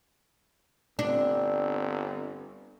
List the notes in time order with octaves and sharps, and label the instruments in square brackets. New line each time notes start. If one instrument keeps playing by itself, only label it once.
[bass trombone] G1 [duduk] C4 [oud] D4